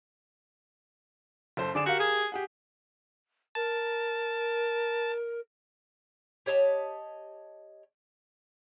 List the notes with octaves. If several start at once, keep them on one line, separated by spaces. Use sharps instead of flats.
F#1 A4 C5
D3 G#4 D5 E7
F#4 G4 A#4 F5
G#4
G4 G#4 F#5
A#4 A5
G4 C#5 D#5 A5